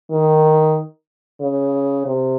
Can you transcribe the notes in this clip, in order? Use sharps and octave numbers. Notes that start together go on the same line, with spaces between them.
D#3
C#3
C3